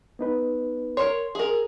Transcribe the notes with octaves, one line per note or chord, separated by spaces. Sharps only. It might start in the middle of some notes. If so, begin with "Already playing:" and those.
B3 D#4 B4
A#4 C#5 C6
G#4 A#4